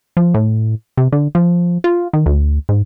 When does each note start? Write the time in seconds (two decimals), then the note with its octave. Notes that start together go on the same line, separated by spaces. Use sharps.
0.17 F3
0.34 A2
0.97 C3
1.12 D3
1.35 F3
1.84 F4
2.13 D#3
2.26 D2
2.69 G#2